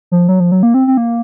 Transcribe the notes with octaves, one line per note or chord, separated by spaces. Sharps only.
F3
F#3
F3
F#3
A#3
C4
C4
A#3